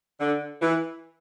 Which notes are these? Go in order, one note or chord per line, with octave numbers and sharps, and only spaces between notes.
D3
E3